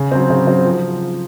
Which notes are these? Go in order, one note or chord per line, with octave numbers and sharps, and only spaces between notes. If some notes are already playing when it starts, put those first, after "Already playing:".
Already playing: C#3
F#3 C4
C#3
F#3 C4
F3